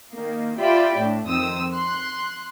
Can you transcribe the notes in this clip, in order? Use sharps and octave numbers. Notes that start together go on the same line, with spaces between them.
D#3 A#3
F4 G4 D5 E5 G5 B5
A2 D4
F2 D#3 C4 D#6 E6
C6 F#6